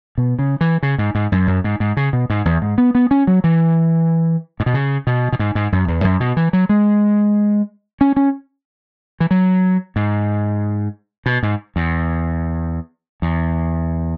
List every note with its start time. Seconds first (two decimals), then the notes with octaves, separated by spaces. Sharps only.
0.18 B2
0.39 C#3
0.61 E3
0.83 C#3
0.98 G#2
1.15 G#2
1.32 F#2
1.47 F#2
1.64 G#2
1.80 G#2
1.97 C#3
2.13 B2
2.30 G#2
2.45 E2
2.62 G#2
2.78 B3
2.95 B3
3.11 C#4
3.27 F#3
3.44 E3
4.60 G#2
4.66 B2
4.74 C#3
5.07 B2
5.32 B2
5.39 G#2
5.55 G#2
5.72 F#2
5.88 E2
6.04 F#2
6.20 B2
6.37 E3
6.53 F#3
6.69 G#3
8.01 C#4
8.17 C#4
9.20 E3
9.31 F#3
9.96 G#2
11.26 B2
11.43 G#2
11.76 E2
13.22 E2